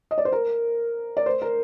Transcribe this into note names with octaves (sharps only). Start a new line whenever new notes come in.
D#5
D5
C5
A#4
D5
C5
A#4